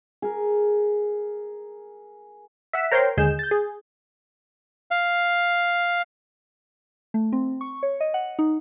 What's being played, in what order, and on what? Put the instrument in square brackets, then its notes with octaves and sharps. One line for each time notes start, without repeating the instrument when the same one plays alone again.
[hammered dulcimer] G#4 A#4
[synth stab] E5 F#5 E6 B6
A#4 C5 C#5 G5 A#5 C6
D#2 D3 G#3 G#4 G6 E7
G6 A6
G#4
[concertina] F5
[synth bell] A3
C4
C#6
C#5
D#5
F#5
D#4